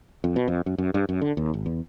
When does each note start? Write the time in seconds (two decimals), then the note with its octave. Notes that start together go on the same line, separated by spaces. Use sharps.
0.24 F2
0.36 B2
0.48 F2
0.66 F#2
0.78 F#2
0.94 G2
1.09 F#2
1.21 D3
1.37 D#2
1.54 G#1
1.66 E2